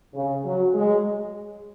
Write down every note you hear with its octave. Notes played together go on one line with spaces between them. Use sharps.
C#3
F#3
G#3